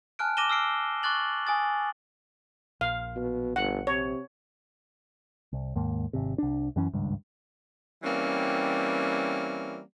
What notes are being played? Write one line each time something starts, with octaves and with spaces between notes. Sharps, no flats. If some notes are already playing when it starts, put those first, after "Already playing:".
G#5 A5 F6 F#6 D7
D6 A#6 D#7 E7 G7
E6 F6 C7 D7
C#6 D6 F#6 A6 F#7
G#5 D#6 A6
A#1 F5
B2
G1 F#5
C3 C#5
C2
D#2 G#2 A#3
G#1 C3
C2 D4
F#2 E3 C#4
G#1 C#2 G2
E3 G3 A#3 C4 C#4